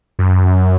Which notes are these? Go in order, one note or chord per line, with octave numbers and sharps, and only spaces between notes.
F#2